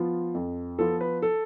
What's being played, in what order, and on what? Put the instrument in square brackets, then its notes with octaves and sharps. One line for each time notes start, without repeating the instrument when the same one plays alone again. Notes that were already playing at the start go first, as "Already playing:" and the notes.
Already playing: [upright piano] F3 B3 F4
F2
F3 B3 F4 A4
B4
A4